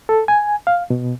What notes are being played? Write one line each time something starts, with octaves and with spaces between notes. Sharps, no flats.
A4
G#5
F5
B2